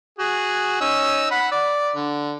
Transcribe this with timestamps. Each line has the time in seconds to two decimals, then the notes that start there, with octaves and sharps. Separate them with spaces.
0.19 F#4 G#4
0.81 C#4 D#4 E6
1.31 F#5 B5
1.52 D5
1.95 D3